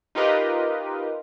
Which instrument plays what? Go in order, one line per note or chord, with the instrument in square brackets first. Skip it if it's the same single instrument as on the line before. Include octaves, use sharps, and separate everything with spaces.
[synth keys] D#4 F4 G4 A#4 B4 D#5